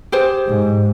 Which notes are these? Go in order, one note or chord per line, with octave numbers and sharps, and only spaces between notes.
G4 G#4 C5
G#2